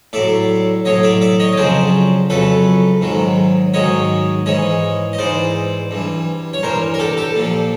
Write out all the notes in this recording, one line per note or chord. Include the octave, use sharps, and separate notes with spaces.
A2 F#3 D5 E5
A2 F#3 C#5 D#5
D5 E5
D5 E5
C#5 D#5
D#5
F2 C#3 F#3 C5 D5
F2 C#3 F#3 A4 B4
G#2 D#3 F#3
G#2 D#3 F#3 C#5 D#5
G#2 E3 C#5 D#5
D#5
G#2 E3 C5 D5
G2 E3
C#5
G2 E3 A#4 C5
A#4
G4 A4
G4 A4
A#2 F3